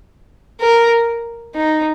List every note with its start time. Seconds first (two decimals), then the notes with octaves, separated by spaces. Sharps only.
0.61 A#4
1.55 D#4